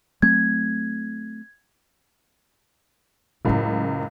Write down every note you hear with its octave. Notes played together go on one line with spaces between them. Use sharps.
F#3 A3 C4 G#6
F#1 C#2 A2 C#4